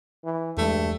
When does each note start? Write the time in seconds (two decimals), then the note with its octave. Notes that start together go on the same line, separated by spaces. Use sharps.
0.24 E3
0.57 E2 G2 G#3 A3